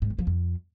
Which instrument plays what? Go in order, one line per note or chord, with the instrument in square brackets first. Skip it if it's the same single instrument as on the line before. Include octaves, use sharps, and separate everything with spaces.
[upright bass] G#2
D#3
F3
F2